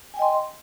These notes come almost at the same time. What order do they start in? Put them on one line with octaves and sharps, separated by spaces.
G#5 G5 D#5 C6